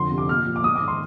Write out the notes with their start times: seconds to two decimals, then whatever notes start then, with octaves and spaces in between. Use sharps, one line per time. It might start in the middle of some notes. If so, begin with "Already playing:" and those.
Already playing: F2 D3 C6
0.11 C3
0.18 D6
0.29 A#2 F6
0.46 F3
0.56 D6
0.64 G#2 D#6
0.76 D6
0.81 D#3
0.88 C6